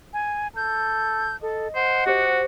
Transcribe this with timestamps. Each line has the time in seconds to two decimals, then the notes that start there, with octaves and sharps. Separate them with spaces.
0.13 G#5
0.56 A4 G6
1.42 A4 D#5
1.75 C5 F#5
2.06 F#4 G4 C5